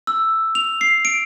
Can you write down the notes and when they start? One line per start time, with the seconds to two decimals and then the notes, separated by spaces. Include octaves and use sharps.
0.07 E6
0.55 F7
0.81 C7
1.05 D7